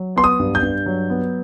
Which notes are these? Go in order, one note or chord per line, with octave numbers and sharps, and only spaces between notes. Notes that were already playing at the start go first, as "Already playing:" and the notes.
Already playing: F#3
B3 C6
D#6
G2
G6
G2
F#3
B3